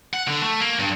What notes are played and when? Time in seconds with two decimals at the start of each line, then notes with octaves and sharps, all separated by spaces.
0.13 F#5
0.28 D3
0.43 A3
0.60 A#3
0.79 G2